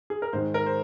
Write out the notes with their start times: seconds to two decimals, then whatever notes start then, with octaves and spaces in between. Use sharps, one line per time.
0.10 G#4
0.22 A#4
0.33 G#2 D#3 G#3 C5
0.54 A#4
0.66 C5